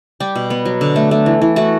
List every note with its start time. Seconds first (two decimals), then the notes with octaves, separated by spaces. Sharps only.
0.20 G3 G4
0.35 B2
0.50 B3
0.65 F#3
0.81 D3
0.96 A3
1.11 A3
1.26 E3
1.41 E3
1.56 A3 F#4